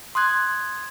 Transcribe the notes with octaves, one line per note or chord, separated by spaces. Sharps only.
C6 D#6 F#6 G#6